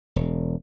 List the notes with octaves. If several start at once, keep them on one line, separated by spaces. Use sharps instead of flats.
E1